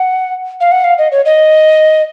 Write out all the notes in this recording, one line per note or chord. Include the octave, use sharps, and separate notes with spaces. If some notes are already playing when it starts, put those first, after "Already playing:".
Already playing: F#5
F5
F#5
F5
D#5
C#5
D#5